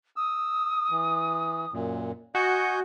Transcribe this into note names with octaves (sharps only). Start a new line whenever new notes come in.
D#6 E6
E3
F#2 A#2
F#4 D#5 G#5 G6 C#7